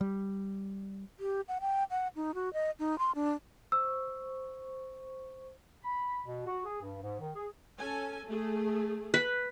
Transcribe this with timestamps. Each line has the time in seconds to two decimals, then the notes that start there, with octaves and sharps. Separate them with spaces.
0.01 G3
1.19 G4
1.48 F#5
1.61 G5
1.91 F#5
2.16 D#4
2.35 F#4
2.53 D#5
2.79 D#4
2.99 C6
3.15 D4
3.72 C5 C#6 E6
5.83 B5
6.26 B2
6.46 F#4
6.65 G#4
6.81 G2
7.03 G#2
7.20 D#3
7.36 G#4
7.78 C#4 A4 G#5
8.27 A3 G#4
9.14 B4